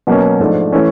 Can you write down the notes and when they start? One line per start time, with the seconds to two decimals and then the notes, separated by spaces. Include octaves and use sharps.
0.07 B2 F#3 A#3 C#4
0.39 G#2 F3 A3 D4
0.72 E3 A3 C#4